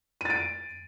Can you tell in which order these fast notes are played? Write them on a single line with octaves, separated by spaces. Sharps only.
D#7 A6 D7